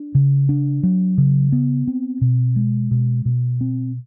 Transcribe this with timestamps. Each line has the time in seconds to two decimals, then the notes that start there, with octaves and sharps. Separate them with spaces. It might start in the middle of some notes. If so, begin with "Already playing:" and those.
Already playing: D4
0.15 C#3
0.49 D4
0.83 F#3
1.18 C#3
1.52 B3
1.87 C4
2.21 B2
2.56 G#3
2.91 B2
3.25 B2
3.61 C4